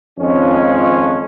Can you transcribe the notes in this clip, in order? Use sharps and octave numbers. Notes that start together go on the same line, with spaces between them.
F2 D#3 F3 G#3 C#4